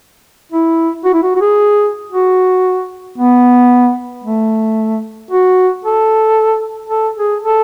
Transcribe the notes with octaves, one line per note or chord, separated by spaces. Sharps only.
E4
F#4
E4
F#4
F#4
G#4
F#4
B3
A3
F#4
A4
A4
G#4
A4